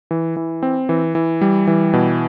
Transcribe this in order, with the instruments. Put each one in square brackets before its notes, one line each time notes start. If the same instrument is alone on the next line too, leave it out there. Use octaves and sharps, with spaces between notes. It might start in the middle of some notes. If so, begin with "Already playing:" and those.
[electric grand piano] E3
E3
C4
E3
E3
G3
E3
B2